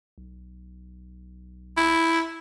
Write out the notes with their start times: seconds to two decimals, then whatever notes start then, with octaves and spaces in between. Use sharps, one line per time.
0.18 B1
1.77 E4